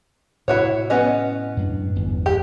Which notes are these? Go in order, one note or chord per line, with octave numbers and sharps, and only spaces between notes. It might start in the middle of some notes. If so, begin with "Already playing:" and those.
A2 C3 E4 F#4 C#5
B3 C#4 D#5
F#2 A2 D4
D1 G1 E2
G4